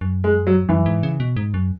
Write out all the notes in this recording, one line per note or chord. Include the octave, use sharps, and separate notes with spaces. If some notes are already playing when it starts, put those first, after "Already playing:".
F#2
G#3
F#3
F#2 E3
G#2
C#3
B2
G#2
F#2